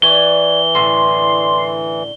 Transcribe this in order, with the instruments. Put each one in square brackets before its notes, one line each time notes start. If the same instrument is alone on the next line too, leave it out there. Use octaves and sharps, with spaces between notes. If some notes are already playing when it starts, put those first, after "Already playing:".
[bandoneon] E3 [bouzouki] B4 C#5 D5 [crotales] G7
[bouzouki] A2 D3 C#4 [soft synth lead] C6